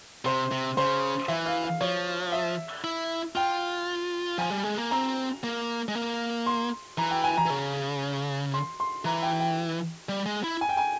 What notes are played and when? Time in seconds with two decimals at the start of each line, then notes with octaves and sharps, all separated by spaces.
0.25 C3 C5
0.51 C3
0.77 C#3 C5
1.28 E3 E5
1.46 F5
1.63 F5
1.81 F3 C#5
2.32 E5
2.84 E4
3.36 F4 G5
4.38 F3 G#5
4.50 G3
4.64 G#3
4.78 A#3
4.91 C4 A#5
5.44 A#3
5.88 G#3
5.95 A#3
6.46 C6
6.98 E3 A#5
7.11 G5
7.24 G#5
7.38 A#5
7.46 E3
7.50 C#3
8.54 C6
8.80 C6
9.05 E3 A#5
9.23 G5
9.40 G5
10.09 G3
10.26 G#3
10.44 E4
10.61 G#5
10.69 G5
10.77 G#5